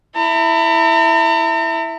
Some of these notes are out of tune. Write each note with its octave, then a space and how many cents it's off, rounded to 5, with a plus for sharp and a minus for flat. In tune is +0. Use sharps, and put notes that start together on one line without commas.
E4 +0 A#5 -45